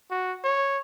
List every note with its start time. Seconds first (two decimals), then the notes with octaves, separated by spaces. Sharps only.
0.11 F#4
0.44 C#5